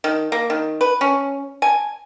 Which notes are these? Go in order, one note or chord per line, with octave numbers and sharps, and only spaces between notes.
D#3
A#3
D#3
B4
C#4
G#5